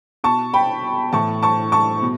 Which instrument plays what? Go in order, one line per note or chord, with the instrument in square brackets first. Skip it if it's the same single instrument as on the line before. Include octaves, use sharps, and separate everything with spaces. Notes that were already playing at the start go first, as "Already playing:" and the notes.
[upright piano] B2 A5 C#6
G5 B5
A2 E3 A5 C#6
A5 C#6
A5 C#6
B2